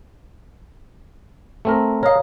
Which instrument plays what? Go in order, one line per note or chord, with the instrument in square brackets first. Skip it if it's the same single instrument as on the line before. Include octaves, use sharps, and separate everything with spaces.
[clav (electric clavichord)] A3 C4 A#4
[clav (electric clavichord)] A#4 D#5 [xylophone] C#5 F5